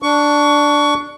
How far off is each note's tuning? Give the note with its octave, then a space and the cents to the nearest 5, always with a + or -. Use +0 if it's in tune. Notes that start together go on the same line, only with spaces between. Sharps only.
D4 +0 C#6 +20